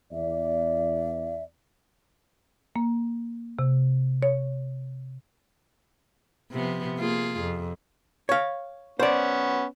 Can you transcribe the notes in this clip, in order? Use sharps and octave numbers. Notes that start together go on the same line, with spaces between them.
E2 D5 E5
A#3
C3
C#5
C3 F3 B3
A#3 F4 G#4
F2
C#5 F5
B3 C#4 C5 D5